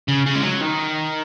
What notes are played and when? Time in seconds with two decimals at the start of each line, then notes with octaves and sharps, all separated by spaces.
0.08 C#3
0.26 C#3
0.36 G#3
0.43 F#3
0.61 D#3